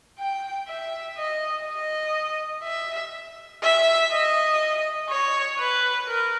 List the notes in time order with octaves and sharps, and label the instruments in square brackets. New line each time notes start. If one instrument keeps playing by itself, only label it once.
[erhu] G5
E5
D#5
D#5
E5
E5
D#5
C#5
B4
A#4